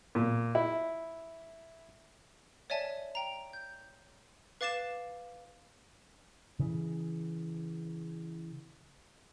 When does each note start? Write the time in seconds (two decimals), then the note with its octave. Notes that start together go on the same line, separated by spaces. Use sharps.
0.15 A#2
0.55 E4
2.70 C#5 D5 E5 G#5 A5
3.15 G5 A#5
3.53 G6
4.61 B4 F5 D6 A6 C7 E7
6.59 C#3 E3